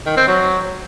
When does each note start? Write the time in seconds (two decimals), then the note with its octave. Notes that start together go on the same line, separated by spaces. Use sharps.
0.06 D#3
0.17 C4
0.28 F#3